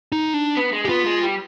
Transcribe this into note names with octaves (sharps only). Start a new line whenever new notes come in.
D#4
D4
B3
G#3
G4
B3 F4
G#3
G3